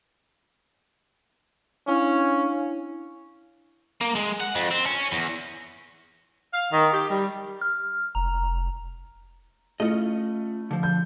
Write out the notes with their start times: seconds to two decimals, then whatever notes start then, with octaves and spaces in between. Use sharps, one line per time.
1.87 C#4 D4 E4 F5
4.01 A#3
4.15 G#3
4.40 F#5
4.55 F2
4.71 C4
4.86 C#4
5.12 E2
6.54 F5
6.72 D#3
6.92 G4
7.10 G3
7.61 F6
8.15 F1 A#5
9.80 A3 C#4 E4 F4 D#5
10.71 D3 F3
10.83 G6